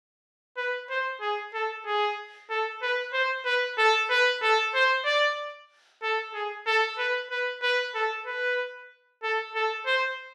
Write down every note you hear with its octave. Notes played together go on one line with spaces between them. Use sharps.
B4
C5
G#4
A4
G#4
A4
B4
C5
B4
A4
B4
A4
C5
D5
A4
G#4
A4
B4
B4
B4
A4
B4
A4
A4
C5